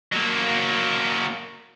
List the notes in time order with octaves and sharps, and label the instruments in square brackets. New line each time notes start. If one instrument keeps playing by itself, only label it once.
[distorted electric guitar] F#3 A#3